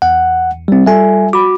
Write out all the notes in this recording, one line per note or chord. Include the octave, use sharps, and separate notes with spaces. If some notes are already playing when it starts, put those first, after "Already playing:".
E2 F#5
G3 C4
G3 F4 A4 E5 G#5
F#4 B5 D6